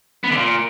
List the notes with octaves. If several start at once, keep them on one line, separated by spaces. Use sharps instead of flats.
B3
D3
A#2